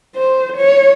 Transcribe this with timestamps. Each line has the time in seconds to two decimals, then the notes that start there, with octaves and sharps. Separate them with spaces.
0.16 C5
0.57 C#5